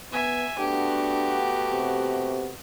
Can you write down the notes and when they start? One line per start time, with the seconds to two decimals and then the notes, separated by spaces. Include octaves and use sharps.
0.12 B3 E5 G#5
0.59 A3 B3 D4 F#4 G4
1.71 C3